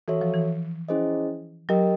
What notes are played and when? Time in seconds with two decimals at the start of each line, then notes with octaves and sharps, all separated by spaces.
0.08 E3 F#4 A4 C#5 E5
0.21 F3
0.34 E3
0.89 C#4 E4 G#4 C5 D#5
1.69 F#3 G4 A#4 D#5 G5